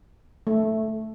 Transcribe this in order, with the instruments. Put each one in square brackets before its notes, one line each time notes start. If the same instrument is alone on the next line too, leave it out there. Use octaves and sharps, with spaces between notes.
[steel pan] A3